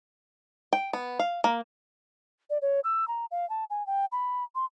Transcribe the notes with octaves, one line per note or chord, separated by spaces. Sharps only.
G5
B3
F5
A#3
D5
C#5
E6
A#5
F5
A5
G#5
G5
B5
C6